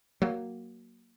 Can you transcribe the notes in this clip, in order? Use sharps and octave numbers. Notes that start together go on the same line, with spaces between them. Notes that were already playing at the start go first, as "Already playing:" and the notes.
F#3 A#3